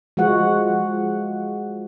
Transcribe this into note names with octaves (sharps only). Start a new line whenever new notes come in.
F3 G#3 F#4 F#5